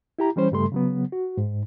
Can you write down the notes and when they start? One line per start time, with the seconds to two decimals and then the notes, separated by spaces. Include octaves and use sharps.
0.19 E4 G4 A#5
0.36 E3 G3 C#4 C5
0.52 G2 C#3 G3 A3 A4 C6
0.72 C#3 F#3 B3
1.12 F#4
1.37 G#2